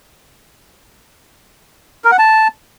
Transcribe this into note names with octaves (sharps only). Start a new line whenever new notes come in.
A#4
F#5
A5